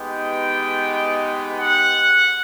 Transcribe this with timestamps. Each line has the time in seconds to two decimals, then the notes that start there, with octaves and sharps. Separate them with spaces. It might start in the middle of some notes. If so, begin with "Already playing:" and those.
Already playing: G#3 B3 D#4 G4
0.11 G5
1.58 F#5